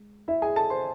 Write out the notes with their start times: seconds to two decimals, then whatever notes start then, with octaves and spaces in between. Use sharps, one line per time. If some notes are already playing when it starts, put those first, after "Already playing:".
Already playing: G#3
0.28 E4 E5
0.42 G#4 G#5
0.56 A4 A5
0.70 C5 C6